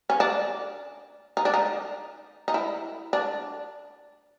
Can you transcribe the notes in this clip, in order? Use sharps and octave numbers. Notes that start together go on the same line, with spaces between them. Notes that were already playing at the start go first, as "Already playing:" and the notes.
C#4
D4
D#4
D4
D#4
D#4
E4
D4